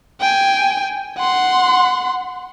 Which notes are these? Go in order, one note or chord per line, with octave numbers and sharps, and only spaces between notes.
G5 G#5
F#5 C6